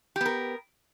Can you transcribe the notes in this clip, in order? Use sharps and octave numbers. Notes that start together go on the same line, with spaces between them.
B3 G4 A#4